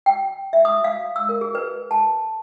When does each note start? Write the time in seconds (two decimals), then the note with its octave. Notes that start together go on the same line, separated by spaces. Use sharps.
0.06 G5
0.53 E5
0.65 D#6
0.84 F5
1.16 E6
1.29 A#4
1.41 G#4
1.55 B4
1.91 A5